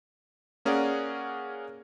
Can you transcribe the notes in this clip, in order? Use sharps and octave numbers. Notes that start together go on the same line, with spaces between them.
A#3 C#4 G#4 A#4 D5 F#5